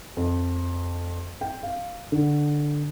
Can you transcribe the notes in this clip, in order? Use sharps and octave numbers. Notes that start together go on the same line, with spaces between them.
F2
G5
F5
D3